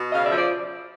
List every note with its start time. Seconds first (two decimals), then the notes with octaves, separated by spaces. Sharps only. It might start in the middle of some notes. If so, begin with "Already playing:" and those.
Already playing: B2
0.12 C#3 D#5 F5
0.25 D5 E5
0.31 F3
0.37 C5 D5